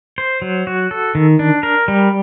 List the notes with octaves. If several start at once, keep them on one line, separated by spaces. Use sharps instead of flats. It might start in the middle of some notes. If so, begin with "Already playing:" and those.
C5
F#3
F#4
A4
D#3
D4
A#4
G3